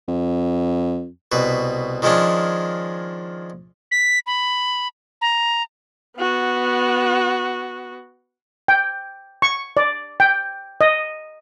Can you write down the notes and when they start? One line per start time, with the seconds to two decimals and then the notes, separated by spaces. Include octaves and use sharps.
0.08 F2
1.32 C2 B2 B4
2.02 D#3 F3 G#3 C#4 D4
3.91 B6
4.27 B5
5.21 A#5
6.18 B3 F#4
8.68 G5
9.42 C#6
9.77 D5
10.20 G5
10.81 D#5